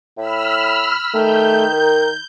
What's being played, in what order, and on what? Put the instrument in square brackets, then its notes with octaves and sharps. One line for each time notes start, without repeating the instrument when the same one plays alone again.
[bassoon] A2 [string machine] B5 E6 F6
[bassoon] D#3 [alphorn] A3 [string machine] G6
[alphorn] A#4